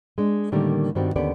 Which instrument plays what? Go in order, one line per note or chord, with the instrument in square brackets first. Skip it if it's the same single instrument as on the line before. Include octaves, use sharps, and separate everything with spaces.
[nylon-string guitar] G#3 D4
A2 D3 D#3 G3 A#3
G2 D#3 G3 C4 F#4
D#2 D3 B3 C#4 G4 D5